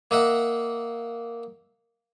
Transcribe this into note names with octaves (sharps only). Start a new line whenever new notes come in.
A#3 D#5 E5 F#5